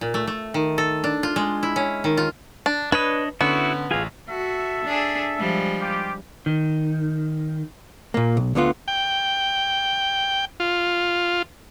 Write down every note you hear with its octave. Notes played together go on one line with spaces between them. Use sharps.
A#2
A3
A3
D#3
A4
D4
F4
G#3
E4
C#4
D#3
F4
D4
D4 B4 C#5 D#5
D3 B3 C#4 E4 F#4 C#6
A1 F4 G#4 F5 G#6
F#4 A4 E5
D4 G#4
F3 G3 G#3
F4 G4
D#3
A#2 A#3
B1
D2 D3 B3 F4
G5
F4